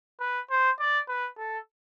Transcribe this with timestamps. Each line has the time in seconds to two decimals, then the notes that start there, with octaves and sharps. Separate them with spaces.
0.20 B4
0.50 C5
0.79 D5
1.09 B4
1.38 A4